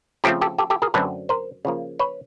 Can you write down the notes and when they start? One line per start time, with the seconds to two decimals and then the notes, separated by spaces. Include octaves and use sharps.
0.24 C#3 F3 A3 C4 G4 A4
0.41 G4 A4
0.58 G4 A4
0.70 G4 A4
0.82 G#4 A#4
0.94 F#2 D3 F#3 A3 C4 A4 B4
1.29 A#4 C5
1.65 C#3 F3 A#3
1.99 B4 C#5